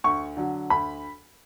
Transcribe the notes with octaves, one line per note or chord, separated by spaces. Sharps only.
D2 C#6
D3 F#3
D2 B5